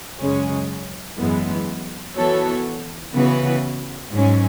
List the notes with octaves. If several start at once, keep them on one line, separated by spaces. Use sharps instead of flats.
F#2 C#3 G#3 C#4
F#2 E3 G#3 B3
E3 B3 F#4 A4 C#5
C#3 E3 B3 F#4 B4
G#2 F#3 C#4